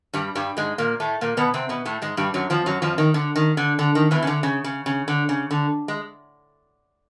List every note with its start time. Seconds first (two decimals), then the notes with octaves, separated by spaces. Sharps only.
0.13 G2 G3
0.35 G2 G3
0.57 G#2 G#3
0.78 A#2 A#3
1.00 A2 A3
1.21 A#2 A#3
1.37 B2 B3
1.54 C3 C4
1.69 B2 B3
1.85 A2 A3
2.02 G#2 G#3
2.17 G2 G3
2.34 F#2 F#3
2.50 F2 F3
2.66 F#2 F#3
2.82 F2 F3
2.98 D#3
3.14 D3
3.36 D#3
3.57 D3
3.79 D3
3.95 D#3
4.11 E2 E3
4.23 C#3
4.27 D3
4.43 C#3
4.64 C#3
4.86 C#3
5.08 D3
5.29 C#3
5.51 D3
5.88 G#3